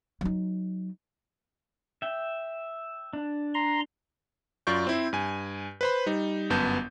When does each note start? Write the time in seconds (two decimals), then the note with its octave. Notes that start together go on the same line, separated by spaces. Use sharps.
0.21 F#3 D#4
2.02 E5 G5
3.13 D4
3.54 A#5 C6
4.67 F#2 F4 D5 C#6 G6
4.87 C4 E4 C5
5.13 G2 G#5
5.81 B4 C5 B5
6.06 G3 D#4
6.50 G1 F#2 B3 A5 G6